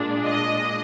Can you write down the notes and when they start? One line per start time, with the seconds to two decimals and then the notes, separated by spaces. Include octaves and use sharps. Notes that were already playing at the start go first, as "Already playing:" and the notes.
Already playing: A#2 G#3 D4
0.25 D#5